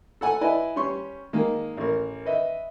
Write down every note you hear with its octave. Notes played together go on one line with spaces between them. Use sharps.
A4 F#5 G#5
E4 B4 D5 D#5 G#5
G3 C#4 C6 C#6
D#3 G#3 A#3
A1 A#4
B4 D#5 E5